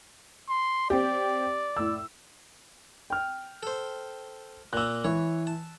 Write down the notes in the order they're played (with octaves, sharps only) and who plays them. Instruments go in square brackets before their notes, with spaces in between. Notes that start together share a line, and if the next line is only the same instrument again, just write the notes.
[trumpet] C6
[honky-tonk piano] C4 G4 [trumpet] D5
[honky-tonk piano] A2 E6
[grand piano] G5 F6
[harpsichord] A4 C5
[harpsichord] A#2 A#3 [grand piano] E6 F#6
[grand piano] E3 [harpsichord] C#5
[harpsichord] A5